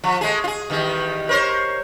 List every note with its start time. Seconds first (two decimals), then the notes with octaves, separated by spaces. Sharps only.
0.04 F3
0.21 G#3 A3 G#4
0.44 F4 G#4
0.70 E2 D#3 G3
1.29 A#4 C5 C#5